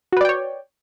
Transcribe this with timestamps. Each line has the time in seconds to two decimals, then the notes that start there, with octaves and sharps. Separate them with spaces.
0.13 F#4
0.17 B4
0.21 D5
0.25 G5
0.29 C#5